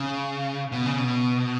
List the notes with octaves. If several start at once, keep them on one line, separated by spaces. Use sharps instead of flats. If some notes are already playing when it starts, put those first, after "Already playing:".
Already playing: C#3
B2
C#3
B2